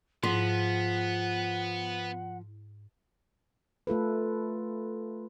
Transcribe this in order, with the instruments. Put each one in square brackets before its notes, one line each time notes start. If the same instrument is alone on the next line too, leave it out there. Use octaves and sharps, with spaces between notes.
[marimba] G#2 [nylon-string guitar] F3 [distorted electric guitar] B3 [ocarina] F#5
[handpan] A3 F4 A4 B4